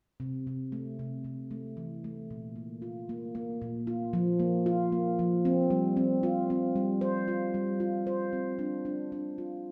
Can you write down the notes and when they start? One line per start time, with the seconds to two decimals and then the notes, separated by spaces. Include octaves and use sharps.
0.20 C3
0.47 C3
0.72 A3
0.99 C3
1.25 C3
1.51 A3
1.77 E3
2.04 A3
2.31 A#2
2.56 A#3
2.82 F4
3.09 A#3
3.35 A#3
3.62 A#2
3.87 F4
4.13 F3
4.40 A#3
4.66 F4
4.92 A#3
5.19 F3
5.45 C4
5.70 G3
5.97 C4
6.23 F4
6.50 C4
6.76 G3
7.01 C5
7.28 F4
7.54 G3
7.80 F4
8.07 C5
8.33 C4
8.59 D4
8.85 D4
9.12 D4
9.38 F4